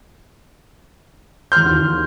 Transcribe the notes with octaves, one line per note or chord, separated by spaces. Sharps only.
E2 C6 F6 G6
D#2